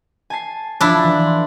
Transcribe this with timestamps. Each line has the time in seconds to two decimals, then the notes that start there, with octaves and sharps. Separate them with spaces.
0.30 G#5 A5 C7
0.81 F3 D4 E4 A6
1.03 E3
1.26 C6